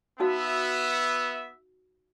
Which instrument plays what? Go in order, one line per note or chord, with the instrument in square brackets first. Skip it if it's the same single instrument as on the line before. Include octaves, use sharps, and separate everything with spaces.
[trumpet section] B3 E5 [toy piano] D#4 F#4 F5